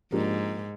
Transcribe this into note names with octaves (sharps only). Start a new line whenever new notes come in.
G#2 F3 A#3 D4 G4 A#4